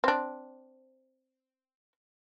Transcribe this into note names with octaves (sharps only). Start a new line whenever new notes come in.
C4 D4